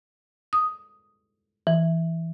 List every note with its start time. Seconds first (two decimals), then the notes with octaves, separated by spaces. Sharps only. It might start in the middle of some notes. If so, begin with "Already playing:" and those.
0.53 D#6
1.67 E3